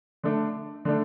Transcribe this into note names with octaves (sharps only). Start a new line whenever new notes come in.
D3 A3 D4
D3 A3 D4